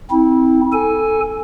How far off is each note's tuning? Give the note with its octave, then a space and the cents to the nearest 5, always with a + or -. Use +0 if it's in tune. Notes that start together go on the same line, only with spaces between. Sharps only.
C4 +0 E4 -35
A4 +0 G#5 +0